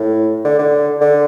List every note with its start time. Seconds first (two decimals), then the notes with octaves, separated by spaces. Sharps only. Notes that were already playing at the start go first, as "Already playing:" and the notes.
Already playing: A2
0.45 D3
0.59 D3
1.01 D3